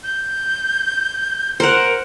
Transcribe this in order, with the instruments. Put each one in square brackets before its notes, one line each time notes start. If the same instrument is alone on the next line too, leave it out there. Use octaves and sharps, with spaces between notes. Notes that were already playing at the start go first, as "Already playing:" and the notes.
[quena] G6
[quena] A#4 [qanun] C5 F#5